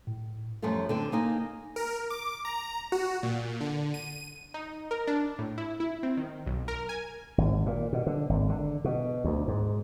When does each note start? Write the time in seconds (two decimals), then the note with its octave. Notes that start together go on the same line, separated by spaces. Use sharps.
0.07 A2
0.62 F#2 F3 G3 A3 F4
0.89 D3 C4 D4
1.12 A#3 D#4 G#5
1.76 A#4
2.10 D6
2.45 A#5
2.92 F#4
3.23 A#2
3.61 D3
3.94 D#7
4.54 D#4
4.91 A#4
5.07 D4
5.39 A2
5.58 E4
5.80 E4
6.03 C4
6.17 D#3
6.46 B1
6.68 A#4
6.89 G#5
7.38 G#1
7.66 A#2
7.93 B2
8.07 D3
8.29 G#1
8.49 D3
8.84 B2
9.24 D2
9.48 G#2